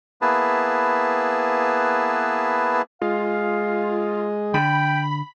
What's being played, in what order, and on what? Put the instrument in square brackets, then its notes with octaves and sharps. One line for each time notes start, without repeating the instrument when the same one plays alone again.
[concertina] A#3 B3 E4 G#4 B4 A5
[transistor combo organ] G#3 G#4 D#5 [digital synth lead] F4 [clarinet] F5
[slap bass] D3 [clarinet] G5 [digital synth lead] B5